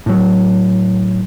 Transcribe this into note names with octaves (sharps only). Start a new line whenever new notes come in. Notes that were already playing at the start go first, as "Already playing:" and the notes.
A2 F#3